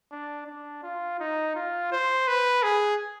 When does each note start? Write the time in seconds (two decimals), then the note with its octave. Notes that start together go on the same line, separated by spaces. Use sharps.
0.12 D4
0.47 D4
0.83 F4
1.20 D#4
1.55 F4
1.92 C5
2.28 B4
2.63 G#4